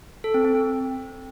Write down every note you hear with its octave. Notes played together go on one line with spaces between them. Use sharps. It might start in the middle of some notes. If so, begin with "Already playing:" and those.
A4
C4
C4
C4